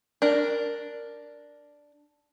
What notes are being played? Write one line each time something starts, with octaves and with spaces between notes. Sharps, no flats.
D4 A#4